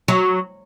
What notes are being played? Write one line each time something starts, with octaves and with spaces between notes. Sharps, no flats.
F#3